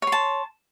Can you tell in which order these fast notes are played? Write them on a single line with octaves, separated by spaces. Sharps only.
C#5 C6 A5